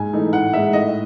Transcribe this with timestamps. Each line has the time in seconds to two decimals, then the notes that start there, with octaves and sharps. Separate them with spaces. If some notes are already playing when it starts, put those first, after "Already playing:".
Already playing: G#2 G#5
0.13 E3 A3 D#4
0.33 A2 F#5
0.53 G#3 D#4 E5
0.73 A2 D#5